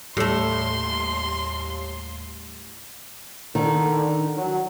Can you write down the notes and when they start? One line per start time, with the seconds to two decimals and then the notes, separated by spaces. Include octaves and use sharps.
0.17 D#2 A2 G3 A3 C6
3.55 D3 D#3
4.37 F#3